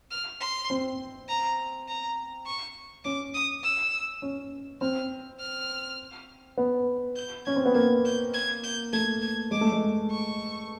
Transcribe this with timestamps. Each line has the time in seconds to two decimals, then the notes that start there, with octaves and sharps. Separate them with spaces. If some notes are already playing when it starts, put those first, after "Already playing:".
0.11 F6
0.41 C6
0.70 C4
1.28 A#5
1.88 A#5
2.46 C#6
3.05 C#4 D6
3.34 D#6
3.63 E6
4.22 C#4
4.81 C4 F6
5.40 F6
6.57 B3
7.16 G6
7.45 C#4 G#6
7.56 C4
7.66 B3
7.75 A#3 G#6
8.05 G6
8.34 G#6
8.64 G6
8.93 A3 G#6
9.22 G#6
9.51 G#3 D6
9.61 A3
9.72 G#3
10.10 C#6